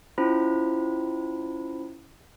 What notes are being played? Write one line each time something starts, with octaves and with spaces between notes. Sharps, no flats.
C#4 E4 F4 C5 B5